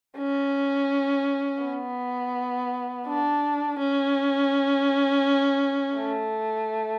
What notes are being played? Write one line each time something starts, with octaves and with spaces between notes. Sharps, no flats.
C#4
B3
D4
C#4
A3